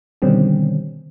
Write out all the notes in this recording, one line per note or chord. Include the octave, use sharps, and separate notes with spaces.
B2 D3 D#3 G3 C4 C#4